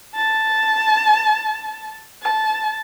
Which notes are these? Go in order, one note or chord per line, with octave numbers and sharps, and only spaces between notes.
A5
A5